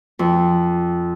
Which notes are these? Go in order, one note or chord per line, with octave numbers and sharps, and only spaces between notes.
F2